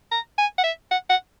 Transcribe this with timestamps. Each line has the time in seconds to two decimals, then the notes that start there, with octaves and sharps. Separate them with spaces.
0.12 A#5
0.38 G#5
0.58 F#5
0.64 E5
0.91 F#5
1.10 F#5